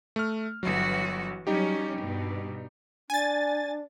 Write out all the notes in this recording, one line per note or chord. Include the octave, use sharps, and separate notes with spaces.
A3 F6
G1 E3 F#3 F#4
F#3 G3 C#4 D#4 G4
G2 B2
D4 G#5 A6